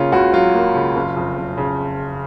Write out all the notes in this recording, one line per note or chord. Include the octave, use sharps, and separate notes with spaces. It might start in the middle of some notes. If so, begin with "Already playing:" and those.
Already playing: C#3 A#3 C#4 F4
C#2 F#4
F#3 F4
A#3
C#3
F#1
F2
F#1
C#3